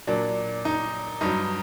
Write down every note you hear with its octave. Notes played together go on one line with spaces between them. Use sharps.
A#2 F#3 D4
D#4
G2 F#3 D#4